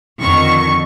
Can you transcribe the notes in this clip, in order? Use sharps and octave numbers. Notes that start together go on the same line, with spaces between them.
F2 D3 D#3 C#6